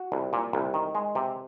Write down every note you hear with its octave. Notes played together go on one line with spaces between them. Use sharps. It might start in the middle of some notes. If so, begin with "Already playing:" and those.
Already playing: F#4
C2
A#2
C2
D#3
G#3
C3